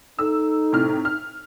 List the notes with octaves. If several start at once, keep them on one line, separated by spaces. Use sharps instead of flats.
D#4 A4 E6
A2 C3 F6
F6